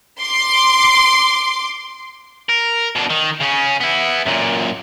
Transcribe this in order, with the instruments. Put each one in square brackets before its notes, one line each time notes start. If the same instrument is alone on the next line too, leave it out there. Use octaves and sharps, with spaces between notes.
[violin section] C6 D6
[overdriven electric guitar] A#4
B2 D4
D#3
C#3 C#4
B3 E4
F#2 A#2